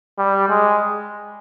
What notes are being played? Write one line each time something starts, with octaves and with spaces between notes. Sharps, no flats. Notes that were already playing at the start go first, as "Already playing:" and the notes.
G3
G#3